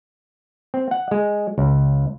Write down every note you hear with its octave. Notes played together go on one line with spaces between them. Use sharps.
C4
F#5
G#3
C#2